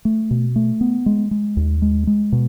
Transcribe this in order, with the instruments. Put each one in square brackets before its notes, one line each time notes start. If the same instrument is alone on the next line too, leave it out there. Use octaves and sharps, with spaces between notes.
[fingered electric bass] A3
B2
A3
B3
G#3
G#3
D#2
G#3
G#3
B2